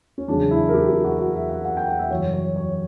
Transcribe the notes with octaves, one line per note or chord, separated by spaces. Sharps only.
C#4
E2 C#3 F#3 D4
E4
A#4
G4
G4
F#4
F#4
E5
F#5
F#5
G5
F#5
E5
F#2 C#3 E3 G3 C#5
C#5
C#5